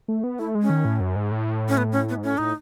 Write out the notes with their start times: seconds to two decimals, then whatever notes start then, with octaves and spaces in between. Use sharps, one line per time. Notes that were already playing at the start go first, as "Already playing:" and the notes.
0.08 A3
0.24 B3
0.39 A3 E4
0.55 G#3
0.62 C#4
0.70 D#3
0.85 A2
1.00 F#2
1.16 G#2
1.31 A2
1.69 C#4
1.77 B3
1.92 C#4
2.09 B3
2.17 G#2
2.24 A2 C#4
2.38 A2 D#4